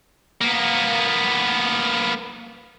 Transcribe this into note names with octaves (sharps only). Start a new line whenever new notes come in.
A#3 B3